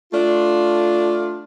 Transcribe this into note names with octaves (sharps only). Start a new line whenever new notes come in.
A3 D4 F4